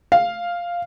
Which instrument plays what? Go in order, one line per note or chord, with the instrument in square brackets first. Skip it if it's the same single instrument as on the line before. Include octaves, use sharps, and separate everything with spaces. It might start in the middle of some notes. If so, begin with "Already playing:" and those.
[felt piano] F5